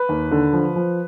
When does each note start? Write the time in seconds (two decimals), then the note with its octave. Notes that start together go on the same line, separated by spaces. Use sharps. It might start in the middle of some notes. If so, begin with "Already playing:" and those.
Already playing: B4
0.09 D#2
0.31 D3
0.53 F3
0.76 F3